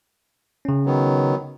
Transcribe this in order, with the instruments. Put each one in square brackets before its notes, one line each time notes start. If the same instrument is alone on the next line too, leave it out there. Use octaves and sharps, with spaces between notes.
[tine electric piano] C#3 C#4
[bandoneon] D#3 F#3 B3